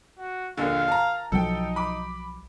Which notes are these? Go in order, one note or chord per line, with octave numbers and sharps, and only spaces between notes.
F#4
A#1 D#2 D3 F5
A5 A#5
B1 F3 F#3 D#4 A4 G5
B5 D6